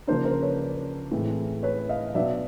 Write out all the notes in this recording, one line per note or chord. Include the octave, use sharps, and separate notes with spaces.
C#3 F3 A#3 D4 A#4 C5
A#4 C5
B4 C#5
A2 E3 G#3 C4
B4 C#5
D#5 F5
B2 F#3 B3 D4 D5 E5